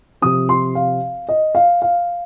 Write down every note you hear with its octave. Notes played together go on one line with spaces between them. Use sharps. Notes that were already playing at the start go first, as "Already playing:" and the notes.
C3 F3 C4 D#6
C6
F5
D#5
F5
F5